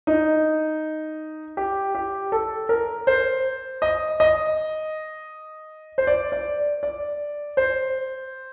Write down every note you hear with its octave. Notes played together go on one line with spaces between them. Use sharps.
D#4
G4
G4
A4
A#4
C5
D#5
D#5
C5
D5
D5
D5
C5